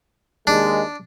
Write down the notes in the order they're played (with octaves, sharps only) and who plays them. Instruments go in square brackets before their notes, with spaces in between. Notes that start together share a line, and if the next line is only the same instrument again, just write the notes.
[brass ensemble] D#2 G#3 [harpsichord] D4